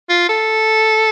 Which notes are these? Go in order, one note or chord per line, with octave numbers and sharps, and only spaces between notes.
F4
A4